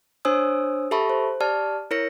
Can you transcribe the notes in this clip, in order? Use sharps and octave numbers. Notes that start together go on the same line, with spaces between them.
D4 C5 C#5 G#5 D#6 E6
G4 A4 E5 A5 B5 C#6
C5
G4 D5 A5 F6
E4 A#4 C#5 A#6 C#7